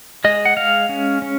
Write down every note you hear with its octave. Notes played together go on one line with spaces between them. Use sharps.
G#3 D#5
F#5
G#3 F5
C#4
C#4